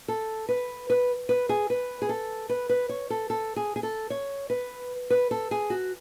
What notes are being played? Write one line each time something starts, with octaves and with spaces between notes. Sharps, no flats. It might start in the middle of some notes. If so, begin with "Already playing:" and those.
A4
B4
B4
B4
G#4
B4
G#4
A4
B4
B4
C#5
A4
A4
G#4
G#4
A4
C#5
B4
B4
A4
G#4
F#4